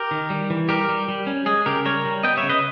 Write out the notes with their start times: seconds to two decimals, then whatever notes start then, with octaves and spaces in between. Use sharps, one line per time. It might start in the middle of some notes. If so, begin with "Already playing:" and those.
Already playing: G4 A#4
0.11 D#3
0.30 G3
0.50 E3
0.69 G3 G4 A#4
0.89 G3
1.09 G3
1.27 C#4
1.46 G#3 G#4
1.66 C#3 G4 A#4
1.85 G3 A#4 C#5
2.05 G3
2.23 B3 D#5 G5
2.37 C#5 E5
2.43 C#3
2.49 B4 D#5